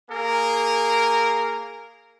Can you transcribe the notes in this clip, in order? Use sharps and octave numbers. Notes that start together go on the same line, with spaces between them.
A#3 G#4 A#4